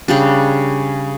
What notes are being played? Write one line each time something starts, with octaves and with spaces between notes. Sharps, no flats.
C#3 G3 D4